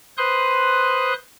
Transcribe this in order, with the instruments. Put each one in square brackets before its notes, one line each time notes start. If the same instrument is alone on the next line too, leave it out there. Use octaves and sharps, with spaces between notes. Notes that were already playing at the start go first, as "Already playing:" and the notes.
[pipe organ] B4 C5 C6 D#6 F#6